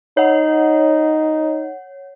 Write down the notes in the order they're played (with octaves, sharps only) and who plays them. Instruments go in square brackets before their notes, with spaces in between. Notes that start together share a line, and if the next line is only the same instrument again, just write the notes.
[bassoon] D#4 [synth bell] C#5 F#5